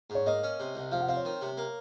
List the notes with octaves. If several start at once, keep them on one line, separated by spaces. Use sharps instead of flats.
G#2
C#5
A#3 D#5
C#4
C3
C2
F3 F5
F#5
C4 F5
C#5
D#3
C3
A#3